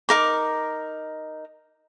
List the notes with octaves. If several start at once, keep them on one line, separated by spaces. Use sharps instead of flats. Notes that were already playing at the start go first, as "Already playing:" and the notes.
D#4 A#4 D6